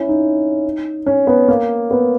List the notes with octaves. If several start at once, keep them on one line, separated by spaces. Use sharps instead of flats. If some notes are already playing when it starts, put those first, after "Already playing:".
Already playing: C#4 E4
D#4
C#4
B3
A#3
B3